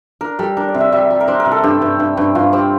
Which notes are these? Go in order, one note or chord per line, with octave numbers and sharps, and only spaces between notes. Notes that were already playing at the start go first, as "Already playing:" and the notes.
D4 A#4
G3 A4
D4 A#4
D5
C3
E5
G3 E5
G3
A#4
D4 C5
A#4
C3
A4
G2 G4
G2
G2
G2
G2 F4
C4 G4